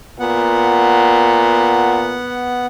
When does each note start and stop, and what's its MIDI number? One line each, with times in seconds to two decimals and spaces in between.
0.19 2.19 46
0.19 2.66 59
0.19 2.66 78